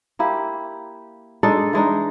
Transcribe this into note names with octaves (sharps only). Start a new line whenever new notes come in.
A#3 E4 G4
G#3 D4 D#4 A4
E3 G#3 D4 D#4